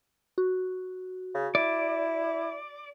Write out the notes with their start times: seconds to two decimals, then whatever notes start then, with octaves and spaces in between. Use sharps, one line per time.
0.38 F#4
1.34 C#3
1.55 E4 D5